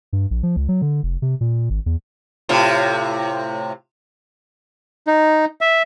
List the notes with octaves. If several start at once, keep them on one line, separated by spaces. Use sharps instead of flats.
G2
A#1
F3
C#2
F#3
D3
F1
C3
A#2
G#1
E2
A2 C3 F4
D#4
E5